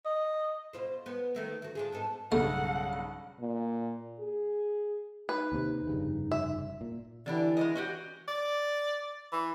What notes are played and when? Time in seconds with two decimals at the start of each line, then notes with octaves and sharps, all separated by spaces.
0.06 D#5
0.73 B2 F4 C5
1.06 B3 B4
1.35 D#3 A3 A#3
1.62 D2 F#4
1.75 D4 F4 G#4
1.92 G#2 B3 A4
2.32 B1 G2 C#3 A3 F#5
3.39 A#2
4.20 G#4
5.29 D#4 B4
5.52 D#2 C3
5.87 F1 G2 C#3
6.31 E5
6.81 A#2
7.26 D3 E3 D4 G4
7.57 G#3 A#4 D#5
7.75 C#4 F#4 G4
8.28 D5
9.33 E3